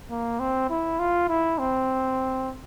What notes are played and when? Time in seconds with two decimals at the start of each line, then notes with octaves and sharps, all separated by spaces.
0.10 A#3
0.40 C4
0.70 E4
0.99 F4
1.29 E4
1.59 C4